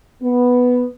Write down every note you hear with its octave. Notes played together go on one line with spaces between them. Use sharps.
B3